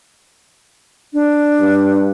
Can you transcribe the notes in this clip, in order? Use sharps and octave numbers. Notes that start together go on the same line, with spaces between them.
D4
G2